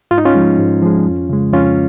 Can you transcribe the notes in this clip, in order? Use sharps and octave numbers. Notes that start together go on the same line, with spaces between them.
G#2 F4
D#4
C#4 F4
F3 G#3
G#2
F3 G#3
F2
C#3 G#3
F2 C#4 F4